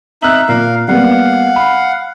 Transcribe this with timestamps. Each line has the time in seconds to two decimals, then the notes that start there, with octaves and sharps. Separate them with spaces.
0.22 D#4 E5 F6 F#6 F#7
0.49 A#2 A#4 F5
0.88 G3 A#3 B3 F5 F#5
1.56 B5